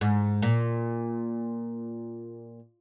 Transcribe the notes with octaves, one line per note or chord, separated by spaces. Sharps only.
G#2
A#2